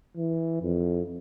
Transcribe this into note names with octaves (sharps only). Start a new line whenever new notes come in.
E3
F2